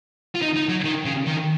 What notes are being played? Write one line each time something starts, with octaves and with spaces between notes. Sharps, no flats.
F4
D#4
D#4
F#3
D#3
C#3
D#3